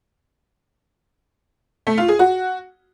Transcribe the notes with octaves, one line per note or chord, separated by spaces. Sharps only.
A3
F4
G#4
F#4